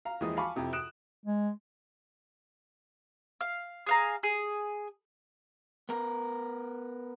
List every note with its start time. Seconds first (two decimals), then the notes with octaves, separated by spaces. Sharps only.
0.05 F5 A#5
0.20 D#2 E3 F3 G#3 E4 D#6
0.37 F5 G#5 A5 B5 C#6 D6
0.56 F2 C3 E4
0.73 D#6 F#6 D7 E7
1.26 G#3
3.41 F5
3.86 G#4 F5 A#5
4.23 G#4
5.89 B3 A#4